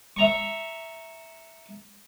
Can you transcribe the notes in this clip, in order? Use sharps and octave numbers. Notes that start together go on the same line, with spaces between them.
E5 A#5 C#6